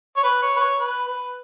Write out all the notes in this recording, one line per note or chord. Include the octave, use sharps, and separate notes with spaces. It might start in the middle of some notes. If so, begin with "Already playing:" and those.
C#5
B4
C#5
B4
C#5
B4
B4